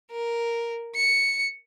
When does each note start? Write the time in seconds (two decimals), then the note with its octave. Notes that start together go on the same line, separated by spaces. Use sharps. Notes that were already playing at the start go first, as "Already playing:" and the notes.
0.12 A#4
0.95 C#7